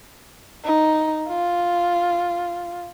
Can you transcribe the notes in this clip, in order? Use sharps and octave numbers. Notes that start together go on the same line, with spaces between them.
D#4
F4